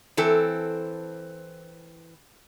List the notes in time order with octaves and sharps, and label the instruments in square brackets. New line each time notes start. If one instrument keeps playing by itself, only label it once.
[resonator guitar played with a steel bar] E3 C4 A4